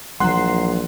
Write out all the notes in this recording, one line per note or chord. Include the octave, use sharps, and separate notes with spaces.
A#1 E3 F#3 G#3 F#5 A#5 C6 F#6